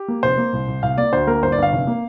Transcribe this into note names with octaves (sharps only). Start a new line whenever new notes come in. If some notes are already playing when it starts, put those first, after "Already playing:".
Already playing: G4
A#3
F1 C5
A#3
C2
C2
C2 F5
A#3 D5
D2 C5
A#3 A#4
G1 C5
D5
G1 F5
F1
A#3